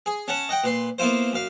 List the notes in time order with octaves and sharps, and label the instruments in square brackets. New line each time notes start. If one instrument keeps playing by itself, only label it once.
[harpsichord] G#4
C#4 C#5 F#5 A5
D#5 F#5 G5
A#2 B4 C6
A#3 B3 E4 F4 C5
F#2 F5